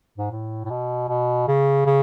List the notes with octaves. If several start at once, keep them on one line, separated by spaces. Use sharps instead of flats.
G#2
A2
A2
B2
B2
C#3
C#3